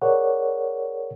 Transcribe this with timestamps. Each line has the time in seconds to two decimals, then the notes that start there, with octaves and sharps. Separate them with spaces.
0.02 G#4 A#4 C#5 D5 F#5